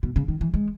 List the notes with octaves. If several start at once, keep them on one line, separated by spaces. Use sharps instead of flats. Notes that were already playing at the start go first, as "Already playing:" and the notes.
B2
C#3
D#3
E3
G#3